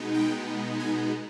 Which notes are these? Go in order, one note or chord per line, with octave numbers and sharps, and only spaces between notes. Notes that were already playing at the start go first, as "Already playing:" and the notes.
Already playing: B2 G#3 B3 D#4
G5
G#5